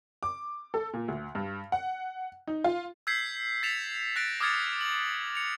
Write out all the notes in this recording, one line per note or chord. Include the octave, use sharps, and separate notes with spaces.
D6
A4
A#2
D2
G2
F#5
D#4
F4
E6 G6 G#6 B6 C7
A6 B6 C#7 E7 F7
F#6 A6 A#6 D7
D6 D#6 F6 G#6 A6 C#7
F#7
C#7 F7